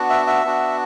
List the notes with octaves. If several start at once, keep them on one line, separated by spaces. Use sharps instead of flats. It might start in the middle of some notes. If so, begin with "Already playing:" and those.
Already playing: B3 D4 F#4
E5
E5
B3 D4 F#4